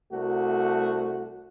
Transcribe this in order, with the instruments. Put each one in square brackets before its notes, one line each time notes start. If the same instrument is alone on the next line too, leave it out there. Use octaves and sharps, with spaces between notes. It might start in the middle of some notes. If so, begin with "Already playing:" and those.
[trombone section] C2 A3 F#4